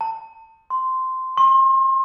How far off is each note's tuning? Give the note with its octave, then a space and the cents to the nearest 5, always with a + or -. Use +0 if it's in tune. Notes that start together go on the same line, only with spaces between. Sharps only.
A5 +30
C6 -10
C6 +35